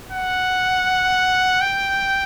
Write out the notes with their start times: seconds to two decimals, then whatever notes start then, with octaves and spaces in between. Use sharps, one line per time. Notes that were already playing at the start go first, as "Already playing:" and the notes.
0.11 F#5
1.61 G5